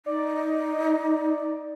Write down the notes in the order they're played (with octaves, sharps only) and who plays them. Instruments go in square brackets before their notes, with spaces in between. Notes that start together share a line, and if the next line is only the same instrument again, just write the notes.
[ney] D#4 [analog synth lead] D5